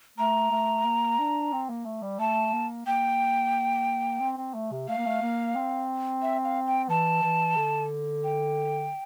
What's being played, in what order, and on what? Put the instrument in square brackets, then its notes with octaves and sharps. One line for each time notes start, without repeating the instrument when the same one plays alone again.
[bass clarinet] A3 [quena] A#5
[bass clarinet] A3
A#3
D4
C4
A#3
A3
G3
[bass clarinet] A3 [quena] A5
[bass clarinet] A#3
[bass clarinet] A#3 [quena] G5
[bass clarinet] C4
C4
A3
C3
[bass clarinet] A3 [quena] F5
[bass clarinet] A#3
A3
A#3
C4
[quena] E5
F5
G5
[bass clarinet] E3 [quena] A5
[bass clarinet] E3
D3
[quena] G5